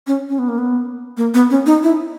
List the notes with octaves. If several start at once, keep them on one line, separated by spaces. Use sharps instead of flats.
C#4
C#4
B3
A#3
B3
A#3
B3
C#4
D#4
E4